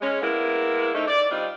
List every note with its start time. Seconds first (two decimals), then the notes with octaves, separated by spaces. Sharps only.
0.01 G#3 C#4
0.22 G#3 A#3 B3 E4 A#4
0.94 D3 A3 C4 D#4
1.07 D5
1.30 G3 C4 D4 D#4 F4